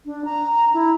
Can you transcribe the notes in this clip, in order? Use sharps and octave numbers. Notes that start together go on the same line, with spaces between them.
D4
A#5
E4